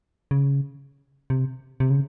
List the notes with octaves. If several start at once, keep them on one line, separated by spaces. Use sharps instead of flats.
C#3
C3
C3
C#3